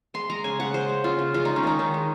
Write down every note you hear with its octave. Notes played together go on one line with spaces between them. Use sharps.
G#3 C6
G#3 A#5
C#3 G#5
C#3 F#5
G#3 C5
G#3
C#3 F4
C#3
G#3 F4
G#3 D#4
C#4
D#3 D#4
D#3
G#3